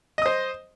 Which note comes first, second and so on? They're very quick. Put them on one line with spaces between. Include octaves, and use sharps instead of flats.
D#5 D#6 C5